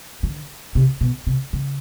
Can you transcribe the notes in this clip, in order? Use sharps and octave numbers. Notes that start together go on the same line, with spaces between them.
D3
C3
B2
C3
C#3